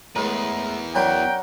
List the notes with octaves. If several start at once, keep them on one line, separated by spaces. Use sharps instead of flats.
E2 A2 G#3 A#4 B4
F#3 C#4 D4 A#4 F#5 G5 B5